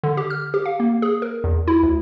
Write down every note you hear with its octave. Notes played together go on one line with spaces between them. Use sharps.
D3
G4
F6
G4
F5
A#3
G#4
A#4
E2
E4
D2